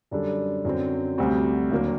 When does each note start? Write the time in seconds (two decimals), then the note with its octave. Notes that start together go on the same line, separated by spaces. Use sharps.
0.11 F#2 D3 G3 D4 A4
0.65 F#2 D3 F#3 C4
1.18 D2 C3 G3 C4 F#4
1.71 D#2 D3 F#3 A#3